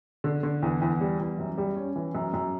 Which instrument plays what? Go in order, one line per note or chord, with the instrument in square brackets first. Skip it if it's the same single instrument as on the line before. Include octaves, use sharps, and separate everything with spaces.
[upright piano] D3
D3
E2
E2
G3
E2
F#2
G3
C#4
E3
F#2
F#2